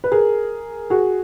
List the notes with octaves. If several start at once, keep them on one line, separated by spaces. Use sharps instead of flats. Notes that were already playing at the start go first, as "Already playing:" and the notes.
B4
G#4 A#4
F#4 G#4